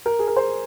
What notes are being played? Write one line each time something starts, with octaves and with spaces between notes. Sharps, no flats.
A#4
G#4
A#4
C5